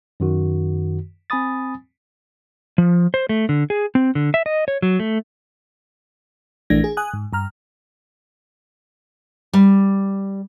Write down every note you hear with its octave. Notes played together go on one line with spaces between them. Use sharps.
F#2 D#3 F#4
C4 G#5 B5 D#6 A6
F3
C5
A3
D3
G#4
C4
D3
E5
D#5
C#5
F#3
A3
A#1 E3 A3 D4 G#6 A#6
G#4
G#5 D#6 F#6
G#2
G2 A#5 F6
G3